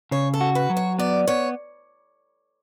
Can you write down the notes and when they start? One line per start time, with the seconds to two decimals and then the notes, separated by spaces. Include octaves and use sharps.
0.11 C#3 C#5
0.34 A4
0.41 F#4
0.55 B4
0.70 F#3
0.77 C#5
0.99 B3 D5
1.27 B3 C#5